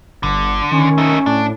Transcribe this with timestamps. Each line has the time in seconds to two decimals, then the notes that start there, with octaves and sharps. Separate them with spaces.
0.23 G1 D3
0.71 D#3 C#4
0.98 A3 D#4
1.26 A2 D4